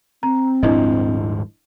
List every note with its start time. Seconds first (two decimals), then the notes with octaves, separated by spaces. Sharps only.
0.23 C4 A#5
0.63 D#1 G#2 F3 D4 E4 D#5